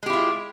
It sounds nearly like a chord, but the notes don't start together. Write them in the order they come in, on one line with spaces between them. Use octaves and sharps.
G#3 G4 E4 F4